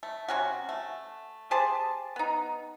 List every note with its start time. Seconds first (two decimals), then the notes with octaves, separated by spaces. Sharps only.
0.03 A3
0.28 C3 C#4 F#4
0.69 A3
1.51 G4 G#4 C5 A5
2.16 B3 D#4